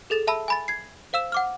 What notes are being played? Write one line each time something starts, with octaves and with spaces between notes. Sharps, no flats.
G#4 A4 A6 E7
E5 A5 B5 E6
G#5 B5 A6
G#6 C7
C5 F5 E6 E7
F#5 D6 F6